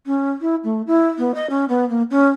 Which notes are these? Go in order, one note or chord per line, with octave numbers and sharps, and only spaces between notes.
C#4
E4
A3
E4
B3
D#5
C#4
B3
A#3
C#4